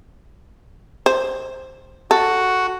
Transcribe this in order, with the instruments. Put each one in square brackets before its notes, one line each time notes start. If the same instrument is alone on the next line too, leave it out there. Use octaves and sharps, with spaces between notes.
[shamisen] C5
[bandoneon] F#4 [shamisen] A4